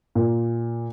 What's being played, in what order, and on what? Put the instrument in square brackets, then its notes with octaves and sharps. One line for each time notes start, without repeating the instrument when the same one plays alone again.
[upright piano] A#2